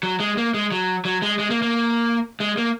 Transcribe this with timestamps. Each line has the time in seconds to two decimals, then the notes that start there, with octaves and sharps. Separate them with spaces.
0.03 F#3
0.20 G#3
0.37 A#3
0.54 G#3
0.72 F#3
1.05 F#3
1.22 G#3
1.39 G#3
1.50 A#3
1.62 A#3
2.40 G#3
2.57 A#3